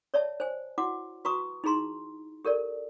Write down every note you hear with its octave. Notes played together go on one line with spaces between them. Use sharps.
C#5 D5 E5 A5
C5 G#5
E4 F#4 F#5 D6
F#4 B4 A#5 C#6 D#6
D#4 E4 G#4 A#5 C6
G4 A4 A#4 D5